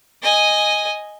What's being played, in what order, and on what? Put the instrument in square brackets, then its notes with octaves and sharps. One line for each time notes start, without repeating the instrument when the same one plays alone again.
[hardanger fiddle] D#5 G#5